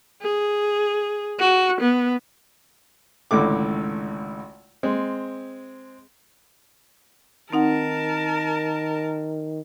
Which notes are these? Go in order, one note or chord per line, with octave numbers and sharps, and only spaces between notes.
G#4
F#4
B3
G#1 C#2 A2 D3 D6
G#3 C4
D#3 C4 D#4 A#4 F#5 A5